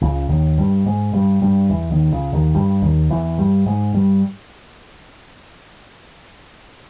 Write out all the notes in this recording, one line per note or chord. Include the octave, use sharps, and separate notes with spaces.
C#2 C#3
D#2 D#3
G2 G3
G#2 G#3
G2 G3
G2 G3
E2 E3
D#2 D#3
C#2 C#3
D#2 D#3
G2 G3
D#2 D#3
E2 E3
G2 G3
G#2 G#3
G2 G3